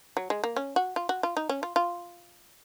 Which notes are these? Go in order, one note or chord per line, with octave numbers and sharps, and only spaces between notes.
F#3
G#3
A#3
C#4
F#4
F4
F#4
F4
D#4
C#4
F4
F4